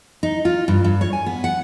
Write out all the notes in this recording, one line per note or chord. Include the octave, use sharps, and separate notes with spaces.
D#4
F4
G2
G2
C#5
G#5
B3
F#5